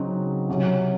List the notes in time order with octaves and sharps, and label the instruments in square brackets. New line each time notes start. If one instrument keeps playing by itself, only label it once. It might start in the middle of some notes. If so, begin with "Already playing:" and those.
Already playing: [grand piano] C#3 F#3 C4 D#4 F#4
C3 F#3 C#4